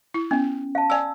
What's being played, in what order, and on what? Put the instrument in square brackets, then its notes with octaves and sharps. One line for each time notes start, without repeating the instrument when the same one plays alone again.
[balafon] E4
[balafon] B3 [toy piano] C#4
[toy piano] F5 A5
[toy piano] D5 E6 [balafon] F5 G#5